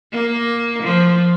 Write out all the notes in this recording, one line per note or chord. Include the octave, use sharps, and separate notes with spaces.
A#3
F3